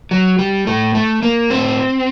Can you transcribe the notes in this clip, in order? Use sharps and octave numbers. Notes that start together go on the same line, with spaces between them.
F#3
G3
A2 A3
A3
A#3
A2 C4